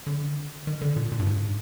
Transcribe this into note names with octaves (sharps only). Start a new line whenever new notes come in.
D3
D#3
D3
A#2
A#2
G2
G#2